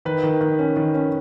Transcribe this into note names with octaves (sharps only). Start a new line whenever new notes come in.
D#3 B4
D#3
D#3
C#4
D#3
C#4